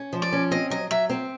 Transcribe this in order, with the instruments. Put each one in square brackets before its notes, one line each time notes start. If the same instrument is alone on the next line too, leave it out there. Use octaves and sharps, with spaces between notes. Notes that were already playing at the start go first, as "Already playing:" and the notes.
Already playing: [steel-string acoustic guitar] C#4
F3
[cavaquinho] D5
[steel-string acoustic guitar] C#4
[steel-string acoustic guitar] C4 [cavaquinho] D#5
[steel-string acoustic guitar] F#3 [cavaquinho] D#5
[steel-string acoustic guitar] F#3 [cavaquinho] E5
[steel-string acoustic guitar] C4